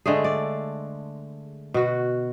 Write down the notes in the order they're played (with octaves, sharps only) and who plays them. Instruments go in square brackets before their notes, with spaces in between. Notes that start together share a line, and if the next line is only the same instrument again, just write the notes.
[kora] D3 G#3 A3 G#4
D5
B2 F#4